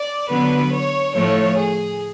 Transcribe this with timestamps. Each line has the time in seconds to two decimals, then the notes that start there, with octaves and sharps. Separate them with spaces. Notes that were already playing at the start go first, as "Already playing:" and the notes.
Already playing: D5
0.30 D3 F#3 B3 B4
0.72 C#5
1.14 A2 F3 A3 C#5
1.57 G#4